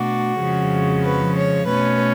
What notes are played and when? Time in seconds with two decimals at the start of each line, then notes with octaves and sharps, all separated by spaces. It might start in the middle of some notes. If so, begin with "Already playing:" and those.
Already playing: B2 A3 D4 F#4
0.39 F2 C#3 F3 G#3
1.04 B4
1.36 C#5
1.67 B2 A3 C#4 B4